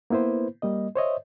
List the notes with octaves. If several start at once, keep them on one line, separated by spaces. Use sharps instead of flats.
A#3 B3 E4 B4 C5
G3 A#3 D#5
C5 C#5 D#5 E5